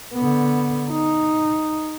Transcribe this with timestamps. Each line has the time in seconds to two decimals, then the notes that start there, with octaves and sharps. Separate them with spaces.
0.14 D3 B3
0.90 D#4